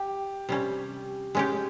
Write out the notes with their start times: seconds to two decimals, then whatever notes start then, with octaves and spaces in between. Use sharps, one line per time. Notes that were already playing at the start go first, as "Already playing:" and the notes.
Already playing: G4
0.49 C3 G3 C#4
1.35 G#3 C#4 G4